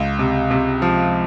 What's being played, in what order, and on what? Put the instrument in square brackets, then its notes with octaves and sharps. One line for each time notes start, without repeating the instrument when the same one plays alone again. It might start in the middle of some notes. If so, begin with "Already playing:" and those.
Already playing: [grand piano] C#2
C3
C3
F3